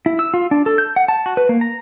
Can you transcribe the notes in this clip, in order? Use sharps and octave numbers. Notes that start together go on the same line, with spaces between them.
E4
E6
F4
D4
A4
G6
F#5
A5
F#4
B4
A#3
A#5